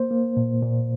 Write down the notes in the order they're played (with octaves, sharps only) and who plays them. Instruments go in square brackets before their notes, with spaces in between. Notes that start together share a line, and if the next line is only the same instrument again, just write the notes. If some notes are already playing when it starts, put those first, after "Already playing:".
Already playing: [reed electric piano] A#3 C5
A#3
A#2
A#2